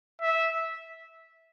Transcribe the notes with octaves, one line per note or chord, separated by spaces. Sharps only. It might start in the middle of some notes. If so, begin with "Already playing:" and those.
E5